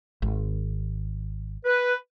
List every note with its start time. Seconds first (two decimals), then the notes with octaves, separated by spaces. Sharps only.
0.22 G#1
1.65 B4